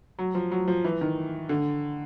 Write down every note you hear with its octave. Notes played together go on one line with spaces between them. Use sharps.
F#3
F3
F#3
F3
E3
D#3
D3